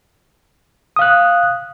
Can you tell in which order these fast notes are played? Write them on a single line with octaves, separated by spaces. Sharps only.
D#6 F5 F#6